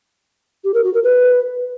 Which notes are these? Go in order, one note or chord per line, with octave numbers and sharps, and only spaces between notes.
G4
A#4
F#4
A#4
B4